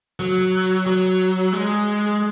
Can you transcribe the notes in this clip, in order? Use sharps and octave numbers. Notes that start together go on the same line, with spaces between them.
F#3
F#3
G#3